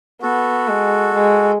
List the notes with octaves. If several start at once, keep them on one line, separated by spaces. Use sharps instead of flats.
B3 F#4 A4
G#3
G#3